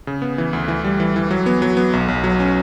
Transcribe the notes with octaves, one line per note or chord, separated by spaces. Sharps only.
C#3
B3
E3
D2
E3
G3
E3
E3
F#3
B3
F#3
B3
B1
B1
F#3
C#4